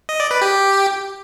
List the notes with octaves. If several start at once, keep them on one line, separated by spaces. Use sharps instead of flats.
D#5
D5
B4
G4